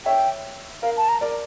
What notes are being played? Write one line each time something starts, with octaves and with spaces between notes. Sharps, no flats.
C#5 E5 G5
A#4 F5
A5
A#5
A#4 D5